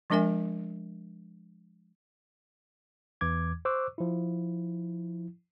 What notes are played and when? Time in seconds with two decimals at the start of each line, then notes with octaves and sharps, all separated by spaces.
0.10 F3 G#3 D4 A#4 E5 G#5
3.21 E2 E3 D6 G#6
3.65 C5 C#6 D6 E6 F#6
3.98 F3 E4